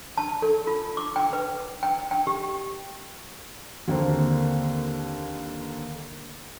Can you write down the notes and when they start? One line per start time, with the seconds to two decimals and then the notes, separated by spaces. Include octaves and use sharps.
0.17 A5
0.42 A4
0.67 F4
0.97 D6
1.16 G5
1.33 B4
1.83 G5
2.11 G5
2.27 G4
3.88 D#2 D3 A#3 C4